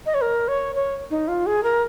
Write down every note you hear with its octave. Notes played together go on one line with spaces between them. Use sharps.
D#5
C#5
A#4
C#5
C#5
D#4
F4
G#4
A#4